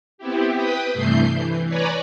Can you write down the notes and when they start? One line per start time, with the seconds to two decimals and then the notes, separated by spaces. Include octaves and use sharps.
0.18 B3 C4 E4 G4
0.56 B4 G5 B5 D#6
0.94 G2 C3 E3 A3 G6 C7
1.35 E3
1.68 B4 C#5 D5 G#5 A#5 B5